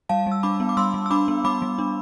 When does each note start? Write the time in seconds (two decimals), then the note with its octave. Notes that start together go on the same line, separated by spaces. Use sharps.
0.09 G3 F5 A5
0.27 G3
0.32 E6
0.43 D4 B5 D6
0.60 B3
0.69 D6
0.77 G3 C6 E6
0.94 G3
1.06 E6
1.11 D4 B5 D6
1.28 B3
1.44 G3 B5 D6
1.62 G3
1.78 D4